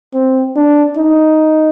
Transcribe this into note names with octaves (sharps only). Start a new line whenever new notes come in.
C4
D4
D#4